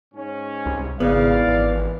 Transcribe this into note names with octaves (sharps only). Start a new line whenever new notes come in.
G#2 C#4
C2
G#1 C#3 B3 E4 D5 F5
G#1 E3